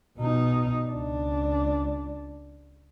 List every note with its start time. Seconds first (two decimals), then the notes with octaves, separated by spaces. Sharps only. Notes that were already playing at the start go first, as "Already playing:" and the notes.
0.18 B2 D#4
0.88 C#2 D4